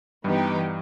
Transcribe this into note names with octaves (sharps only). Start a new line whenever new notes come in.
G2 E3 G3 B3 D#4 G4